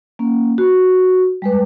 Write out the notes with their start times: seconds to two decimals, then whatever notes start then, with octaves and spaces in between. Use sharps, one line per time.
0.19 A#3 C#4
0.58 F#4
1.42 G3 G#3 B4